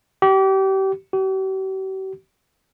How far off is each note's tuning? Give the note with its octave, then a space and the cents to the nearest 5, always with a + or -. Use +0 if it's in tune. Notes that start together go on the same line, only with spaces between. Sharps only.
G4 -30
G4 -45